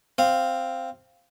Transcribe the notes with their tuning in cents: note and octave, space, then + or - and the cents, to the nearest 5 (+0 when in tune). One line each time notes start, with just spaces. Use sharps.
C4 +0 F5 +0